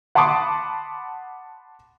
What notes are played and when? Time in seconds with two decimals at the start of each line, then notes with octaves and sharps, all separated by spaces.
0.15 F#5 A5 B5 C6 D6 D#6